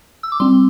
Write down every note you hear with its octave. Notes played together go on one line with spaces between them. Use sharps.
E6
D6
G3 C4 C6